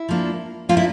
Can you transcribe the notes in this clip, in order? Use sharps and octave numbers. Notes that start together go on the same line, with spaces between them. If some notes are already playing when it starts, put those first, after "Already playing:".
Already playing: E4
F3 A#3 D4
F3 A#3 D4 F4
E4